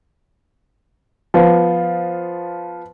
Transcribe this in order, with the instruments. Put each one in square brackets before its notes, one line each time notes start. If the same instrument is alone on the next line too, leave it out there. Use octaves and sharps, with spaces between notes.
[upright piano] F3 B3 F4